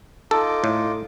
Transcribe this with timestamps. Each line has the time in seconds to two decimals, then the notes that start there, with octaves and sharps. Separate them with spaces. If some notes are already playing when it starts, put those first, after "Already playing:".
0.31 D#4 F4 A4 D6
0.64 A2